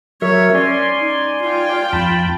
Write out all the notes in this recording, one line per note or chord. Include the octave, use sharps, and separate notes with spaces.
F#3 A#4 C#5 E5
C#4 D5 G#5 C6
D#4
F4 G5
F2 A5 B5